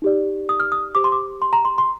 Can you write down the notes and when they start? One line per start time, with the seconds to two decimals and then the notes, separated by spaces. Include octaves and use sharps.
0.02 D#4 G4 D5
0.49 D#6
0.60 F6
0.72 D#6
0.95 G4 C5 D6
1.04 C6
1.12 D6
1.42 C6
1.53 A#5
1.65 C6
1.78 C6